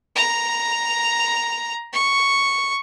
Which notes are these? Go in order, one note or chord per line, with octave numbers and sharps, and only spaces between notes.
A#5
C#6